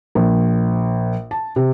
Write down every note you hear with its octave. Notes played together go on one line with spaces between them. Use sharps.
A#1
A5
C3